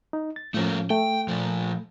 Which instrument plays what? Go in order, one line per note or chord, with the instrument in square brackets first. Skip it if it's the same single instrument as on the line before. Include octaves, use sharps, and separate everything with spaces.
[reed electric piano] D#4
A6
[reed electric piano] A2 F3 C#4 [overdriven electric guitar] A3 A#3
[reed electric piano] A3 [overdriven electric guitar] G5
[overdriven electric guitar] A#2 F3